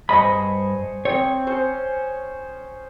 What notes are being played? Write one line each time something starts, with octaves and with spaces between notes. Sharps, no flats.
G2 G#4 C5 D#5 B5 C#6
C4 C#5
C#4 C5